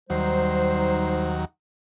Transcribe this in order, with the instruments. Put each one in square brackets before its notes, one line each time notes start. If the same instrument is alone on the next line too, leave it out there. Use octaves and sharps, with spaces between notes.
[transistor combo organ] D#2 F#3 [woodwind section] G3 D#4 C5